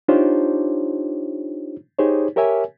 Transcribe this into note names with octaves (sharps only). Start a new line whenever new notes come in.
D4 D#4 F4 G4 C5 C#5
D#4 G4 G#4 C5 C#5
G4 A#4 C#5 E5 G#5